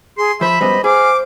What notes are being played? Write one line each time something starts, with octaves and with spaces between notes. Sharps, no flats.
G#4 C6
F3 C5 E5 B5
F#2 G3 B3 C5 D#5
G#4 C5 F5 D6